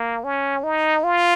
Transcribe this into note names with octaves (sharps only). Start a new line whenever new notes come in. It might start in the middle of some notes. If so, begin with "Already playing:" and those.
Already playing: A#3
C#4
D#4
F4